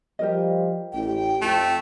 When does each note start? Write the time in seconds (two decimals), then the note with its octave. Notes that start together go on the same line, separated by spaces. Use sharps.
0.19 F3 G3 G4 A#4 D#5
0.93 A1 G5
1.41 F2 A3